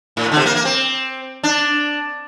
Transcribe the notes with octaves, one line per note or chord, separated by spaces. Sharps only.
A2
A#2
D3
C3
A#3
A#3
C4
D4